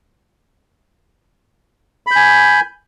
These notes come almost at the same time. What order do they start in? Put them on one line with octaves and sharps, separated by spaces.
B5 G6 G#5